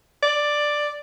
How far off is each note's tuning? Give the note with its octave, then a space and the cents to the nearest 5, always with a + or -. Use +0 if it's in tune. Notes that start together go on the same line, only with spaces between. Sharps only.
D5 +5